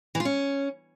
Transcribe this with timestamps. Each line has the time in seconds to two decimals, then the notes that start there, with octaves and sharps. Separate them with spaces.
0.15 E3
0.20 F4
0.25 C#4